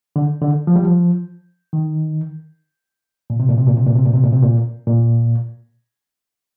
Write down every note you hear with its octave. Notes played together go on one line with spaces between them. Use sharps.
D3
D3
F3
G3
F3
D#3
A#2
C3
A#2
C3
A#2
C3
A#2
C3
A#2
C3
A#2
C3
A#2
A#2